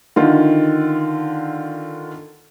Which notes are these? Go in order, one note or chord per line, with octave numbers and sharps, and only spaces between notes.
D3 D#3 F4